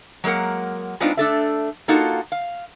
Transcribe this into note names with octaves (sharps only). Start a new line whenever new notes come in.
F#3 G#3 A#3 A#4 F#5
G#3 B3 C4 D4 D#4 F4
A3 D4 A4 E5
A#3 D#4 F4 F#4 A4
F5